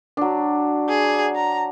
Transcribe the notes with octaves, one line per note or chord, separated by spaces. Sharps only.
F#3 D4
G#4
A#5